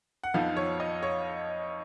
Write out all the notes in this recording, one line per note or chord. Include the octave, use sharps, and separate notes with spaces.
F#5
F2 F3 B3 D#4 F5
C#5
D#5
C#5